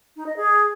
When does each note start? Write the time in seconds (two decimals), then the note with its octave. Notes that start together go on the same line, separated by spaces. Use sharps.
0.16 D#4
0.26 D#5
0.37 G#4